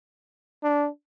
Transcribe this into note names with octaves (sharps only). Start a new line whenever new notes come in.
D4